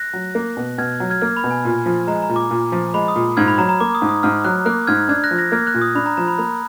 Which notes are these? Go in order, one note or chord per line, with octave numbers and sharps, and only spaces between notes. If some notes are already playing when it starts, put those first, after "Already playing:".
Already playing: F#6 A#6
F#3
A#3
B2
B2 F6 G#6
F#3
F6 G#6
A#3 F6 G#6
B5
B2
G#5
A#2
F3
G#3 A#5
A#5
A#2
D6
A#2
F3
G#3 B5
D#6
A#2
G#2 F6 G#6
B5
F#3 A#5
A#5
A#3 D6
D#6
G#2
D#6
G#2 F6
F#3 F#6
A#3 F#6
G#2 F6 G#6
D4 F6 G#6
F#6 A#6
F3
F#6 A#6
A#3 F6 G#6
F#6
A#2
D#6
D4 B5
A#5
F3 A#5
B5
A#3 B5